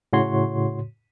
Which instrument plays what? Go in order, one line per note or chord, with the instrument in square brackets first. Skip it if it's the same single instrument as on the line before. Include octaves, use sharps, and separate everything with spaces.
[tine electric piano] A2 C#3 F#4 C#5 C6